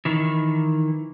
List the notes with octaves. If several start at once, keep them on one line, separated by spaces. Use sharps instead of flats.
D#3 E3